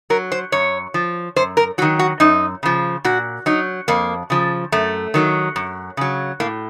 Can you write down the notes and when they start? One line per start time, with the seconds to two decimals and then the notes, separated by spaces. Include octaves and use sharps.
0.10 F#3 A#4
0.32 C5
0.52 F#2 C#5
0.94 F3
1.36 F#2 C5
1.57 A#4
1.78 F#3 F#4
1.82 D#3
1.99 F#4
2.20 F#2 D#4
2.63 C#3 F3
3.04 A#2 F#4
3.46 F#3 D#4
3.88 F2 A#3
4.30 C#3 F3
4.72 F#2 A3
5.14 D#3 F#3
5.56 F#2
5.97 C#3 F#3
6.40 A2 A#3